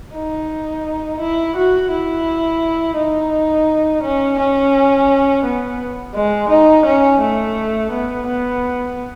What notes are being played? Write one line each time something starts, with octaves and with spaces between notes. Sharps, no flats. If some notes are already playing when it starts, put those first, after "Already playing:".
D#4
E4
F#4
E4
D#4
C#4
C#4
B3
G#3
D#4
C#4
A3
B3
B3